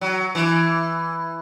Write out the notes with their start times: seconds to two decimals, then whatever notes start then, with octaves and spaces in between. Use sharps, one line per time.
0.01 F#3
0.35 E3